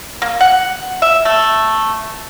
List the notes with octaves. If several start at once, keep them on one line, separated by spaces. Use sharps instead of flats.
A#3
F#5
E5
A3